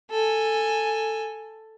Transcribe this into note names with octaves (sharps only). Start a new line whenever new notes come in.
A4 G#5